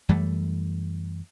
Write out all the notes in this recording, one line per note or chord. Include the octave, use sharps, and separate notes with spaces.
F#2 E3 G3 A3